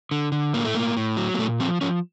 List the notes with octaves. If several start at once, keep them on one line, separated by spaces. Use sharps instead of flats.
D3
D3
A2 A#3
A3
A2 A#3
A2
F#3
A#3
A#2 A3
F3 C4
F3 C#4